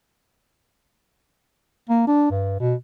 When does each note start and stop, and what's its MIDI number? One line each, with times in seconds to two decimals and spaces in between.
1.90 2.06 58
2.07 2.29 62
2.31 2.58 43
2.60 2.74 47